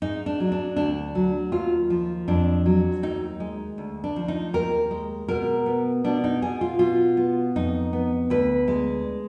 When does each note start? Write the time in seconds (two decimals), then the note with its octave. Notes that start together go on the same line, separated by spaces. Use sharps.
0.02 G#2 D#4
0.26 D4
0.40 F#3
0.52 D4
0.76 D2 D4
1.15 F#3
1.52 D#2 F4
1.90 F3
2.28 F2 D4
2.66 F#3
3.03 D#2 D#4
3.40 G#3
3.78 D2
4.04 D4
4.16 F3
4.28 D#4
4.53 D#2 A#4
4.91 G#3
5.28 B2 A#4
5.66 B3
6.04 B2 D4
6.24 D#4
6.42 B2 G#4
6.61 F4
6.79 B2 F4
7.17 B3
7.56 F2 D#4
7.93 B3
8.30 D2 B4
8.68 G#3